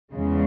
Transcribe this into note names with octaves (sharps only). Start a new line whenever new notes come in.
E2 C#3 G#3